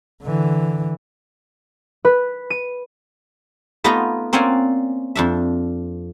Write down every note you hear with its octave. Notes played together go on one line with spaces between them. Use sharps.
D3 E3
B4
D#7
A3 B3 D#4 F4 B4 D#5
A#3 C4 C#4 D5 F#5 G#5
F2 D4 E5